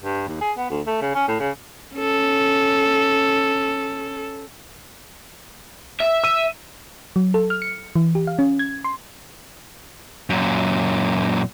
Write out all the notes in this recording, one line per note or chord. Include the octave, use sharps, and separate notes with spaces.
G2
D#2
G#4
B3
D2
A3
C#3
C#4
A2
C#3
C#4 A4
E5
E6 D#7
F#3
A4
F6
C#7
E3
G4
F5
C#4
G#6
C6
F#2 A#2